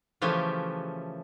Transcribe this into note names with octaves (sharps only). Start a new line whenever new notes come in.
C#3 E3 F3 A3 C#4 G4